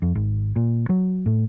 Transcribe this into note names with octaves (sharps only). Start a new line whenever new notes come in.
F2
G#1
A#2
F#3
A2